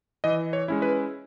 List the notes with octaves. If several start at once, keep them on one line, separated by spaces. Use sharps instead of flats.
E3 D#5
C#5
G#3 C#4 E4
B4